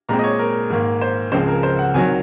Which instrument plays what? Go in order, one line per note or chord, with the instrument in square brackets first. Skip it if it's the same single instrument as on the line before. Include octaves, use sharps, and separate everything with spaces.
[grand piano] A#2 G#3 C4 A#5
D#5
C#5
A#4
G#2 D#3 A#3
C5
C#2 C#3 F3 G#3 C4 C5
A#4
C5
F#5
C2 C3 D#3 F#3 G#5